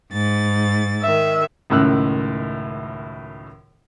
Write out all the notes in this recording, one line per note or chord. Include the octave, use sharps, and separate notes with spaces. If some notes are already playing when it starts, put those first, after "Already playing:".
G#2 A6
D#3 E5
C#2 F#2 A2 D#3 E6 F#6